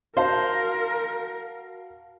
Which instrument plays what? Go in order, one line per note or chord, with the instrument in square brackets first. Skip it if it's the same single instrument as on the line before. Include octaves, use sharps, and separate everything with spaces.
[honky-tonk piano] F#4 F5 A5 [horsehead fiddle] A#4 [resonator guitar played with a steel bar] C5